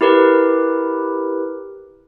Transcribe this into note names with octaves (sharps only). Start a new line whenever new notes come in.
E4 G4 A#4 B4